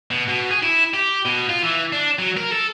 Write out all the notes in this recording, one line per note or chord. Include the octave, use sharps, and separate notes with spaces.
B2
B2
G#4
E4
G4
B2
F4
E3
D4
F#3
A#4
A4